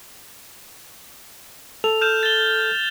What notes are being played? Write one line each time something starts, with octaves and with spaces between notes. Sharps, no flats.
A4 F7
F6 G6 E7
A6 G7